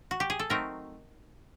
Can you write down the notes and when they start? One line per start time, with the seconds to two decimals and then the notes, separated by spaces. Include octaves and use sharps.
0.11 F#4
0.20 G4
0.30 G#4
0.39 A4
0.50 F#3 A3 C4 D#4 A#4